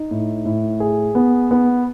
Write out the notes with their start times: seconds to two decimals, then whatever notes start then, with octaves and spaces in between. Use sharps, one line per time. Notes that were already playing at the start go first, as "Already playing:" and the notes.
Already playing: D#4
0.11 A2
0.45 A2
0.80 G#4
1.15 B3
1.51 B3